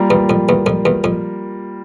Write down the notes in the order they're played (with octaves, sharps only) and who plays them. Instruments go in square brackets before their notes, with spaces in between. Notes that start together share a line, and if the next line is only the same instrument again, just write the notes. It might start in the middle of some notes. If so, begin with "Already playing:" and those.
Already playing: [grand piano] G3 A#3 F4 A#4
[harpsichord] E2
F2
E2
F2
E2
F2